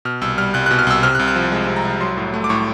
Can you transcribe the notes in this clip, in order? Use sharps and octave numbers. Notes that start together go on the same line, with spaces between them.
B2 F6
C2 E6
G3 F6
C2 F#6
B2 F#6
F6
C2 E6
C3 F6
F#6
C2
F#6
F3
G#3
C3
A#5
C2
F#3 C6
A2
A3
D6
A2 C#6